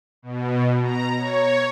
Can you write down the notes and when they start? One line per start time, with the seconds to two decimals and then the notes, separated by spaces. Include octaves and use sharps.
0.22 B2
0.83 A#5
1.17 C#5